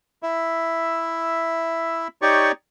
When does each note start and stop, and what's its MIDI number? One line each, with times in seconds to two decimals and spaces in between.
0.23 2.08 64
0.23 2.08 76
2.22 2.52 63
2.22 2.52 67
2.22 2.52 73
2.22 2.52 74
2.22 2.52 85